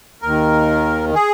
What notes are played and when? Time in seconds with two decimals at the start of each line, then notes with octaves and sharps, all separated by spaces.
0.22 D#2 D#3 A#4
1.15 G#4